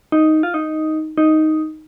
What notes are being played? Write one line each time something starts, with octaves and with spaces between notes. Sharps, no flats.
D#4
F4
D#4
D#4